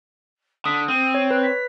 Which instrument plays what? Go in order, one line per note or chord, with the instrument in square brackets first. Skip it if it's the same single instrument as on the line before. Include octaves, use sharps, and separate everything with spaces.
[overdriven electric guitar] D3 [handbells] D#6 [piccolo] B6
[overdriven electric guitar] C4 [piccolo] D#7
[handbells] C#5
[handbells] B4 [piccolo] F#6
[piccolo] B6